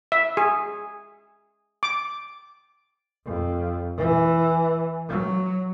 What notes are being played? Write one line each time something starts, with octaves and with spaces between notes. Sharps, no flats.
E5
G#4
D6
F2
E3
F#3